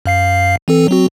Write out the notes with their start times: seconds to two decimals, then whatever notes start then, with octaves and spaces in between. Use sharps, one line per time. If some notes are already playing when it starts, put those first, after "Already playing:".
0.06 F#2 F5 C7
0.68 E3 C4 A4
0.88 F#3 C4 F#4